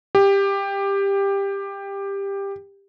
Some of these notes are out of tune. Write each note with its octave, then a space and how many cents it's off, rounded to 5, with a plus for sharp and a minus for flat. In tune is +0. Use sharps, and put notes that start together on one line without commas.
G4 +15